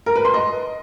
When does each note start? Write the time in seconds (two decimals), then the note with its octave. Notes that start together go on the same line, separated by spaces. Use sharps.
0.06 A#4
0.16 B4
0.25 C6
0.34 D#5